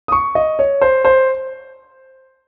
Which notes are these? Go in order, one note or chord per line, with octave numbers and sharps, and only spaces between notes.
D#6
C#6
D#5
C#5
C5
C5